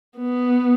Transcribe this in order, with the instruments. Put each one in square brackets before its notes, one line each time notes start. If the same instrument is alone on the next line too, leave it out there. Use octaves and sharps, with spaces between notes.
[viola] B3